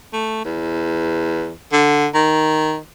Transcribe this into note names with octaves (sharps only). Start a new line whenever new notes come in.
A3
E2
D3
D#3